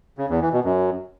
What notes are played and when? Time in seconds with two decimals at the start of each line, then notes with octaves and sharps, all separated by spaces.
0.18 C#3
0.30 E2
0.41 E3
0.53 B2
0.65 F#2